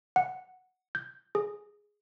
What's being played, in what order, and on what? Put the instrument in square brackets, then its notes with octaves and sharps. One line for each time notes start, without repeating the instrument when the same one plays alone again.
[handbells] F#5
G6
G#4